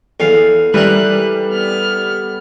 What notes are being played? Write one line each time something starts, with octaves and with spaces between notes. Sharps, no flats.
E2 A4 F5
E3 G3 A#4 F#6
B3 F6